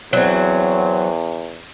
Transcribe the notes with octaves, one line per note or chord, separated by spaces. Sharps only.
E2 F#3 C4